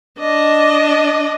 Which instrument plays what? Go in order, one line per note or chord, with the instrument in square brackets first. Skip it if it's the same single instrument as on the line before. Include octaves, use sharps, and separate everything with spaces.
[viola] D4 D#5